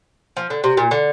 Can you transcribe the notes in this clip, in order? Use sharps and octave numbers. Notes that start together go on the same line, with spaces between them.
F3
D3
C3
A#2
D3